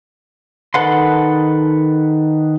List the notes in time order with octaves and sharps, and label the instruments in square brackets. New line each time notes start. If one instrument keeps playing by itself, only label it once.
[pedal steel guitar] D#3 A4 B4 F#5 C6